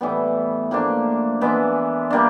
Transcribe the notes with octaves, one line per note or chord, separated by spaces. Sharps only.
A2 E3 G3 B3
A2 F3 A#3 D4
E3 G#3 B3 D4
G3 A#3 D4